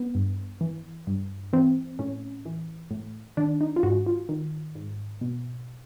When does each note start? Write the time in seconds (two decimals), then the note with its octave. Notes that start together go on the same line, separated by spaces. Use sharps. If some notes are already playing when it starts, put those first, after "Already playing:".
Already playing: B3
0.15 G2
0.61 E3
1.07 G2
1.53 E3 C4
1.99 A2 C#4
2.45 E3
2.91 A2
3.37 D#3 D4
3.61 D#4
3.76 F4
3.83 G#2 F#4
4.07 F4
4.29 D#3
4.75 G#2
5.21 B2